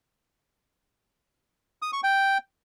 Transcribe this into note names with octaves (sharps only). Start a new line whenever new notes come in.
D#6
C#6
G5